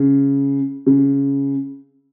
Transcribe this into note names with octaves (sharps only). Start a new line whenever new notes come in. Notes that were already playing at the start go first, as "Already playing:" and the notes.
Already playing: C#3
C#3